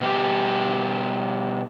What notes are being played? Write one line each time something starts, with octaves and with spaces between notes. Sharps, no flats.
B2 G3 G4